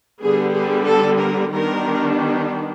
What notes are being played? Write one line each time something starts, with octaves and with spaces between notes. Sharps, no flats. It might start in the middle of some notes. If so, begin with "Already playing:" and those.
D3 G3 B3 G#4
G#4
A4
A#4
D#3 G3 B3 D4 A#4